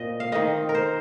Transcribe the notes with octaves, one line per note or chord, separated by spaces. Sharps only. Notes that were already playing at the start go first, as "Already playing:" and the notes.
Already playing: A#2 C4 D#5
F5
D#3 C4 D#5
A#4
C5